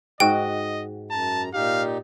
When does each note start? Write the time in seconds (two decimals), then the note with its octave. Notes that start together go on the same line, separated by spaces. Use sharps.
0.20 G#2 F#4 D#5 G5
1.11 F#2 A5 A#5
1.54 A#2 D#4 G4 F5